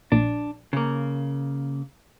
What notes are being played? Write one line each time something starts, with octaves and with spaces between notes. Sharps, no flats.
A#1 D4
C#3 A#3